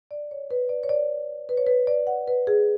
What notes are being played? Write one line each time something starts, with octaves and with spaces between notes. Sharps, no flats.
D5
C#5
B4
D5
C#5
D5
B4
C#5
B4
D5
F#5
B4
G#4